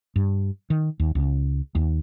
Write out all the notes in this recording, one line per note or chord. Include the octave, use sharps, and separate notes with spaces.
G2
D#3
D#2
C#2
D#2